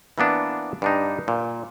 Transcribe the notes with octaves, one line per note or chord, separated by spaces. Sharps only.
E3 A#3 B3 D4
G2 D4 D#4
A#2